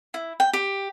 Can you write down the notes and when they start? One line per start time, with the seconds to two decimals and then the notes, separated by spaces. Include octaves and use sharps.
0.14 E4
0.40 G5
0.53 G4